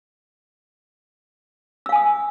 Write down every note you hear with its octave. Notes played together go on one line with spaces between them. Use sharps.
F5 G#5 D#6 E6